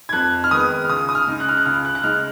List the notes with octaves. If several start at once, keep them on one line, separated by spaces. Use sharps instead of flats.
G#6
F2 F#6
F6
D#3 G#3 B3 D#6
F6
C#2 D#6
D#6
F6
C#3 G#3 D#4
F#6
F6
F#6
C#2 F6
F#6
F#6
C#3 G#3 D#4 F6